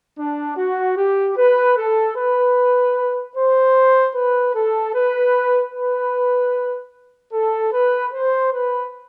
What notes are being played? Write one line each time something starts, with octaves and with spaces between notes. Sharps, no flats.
D4
F#4
G4
B4
A4
B4
C5
B4
A4
B4
B4
A4
B4
C5
B4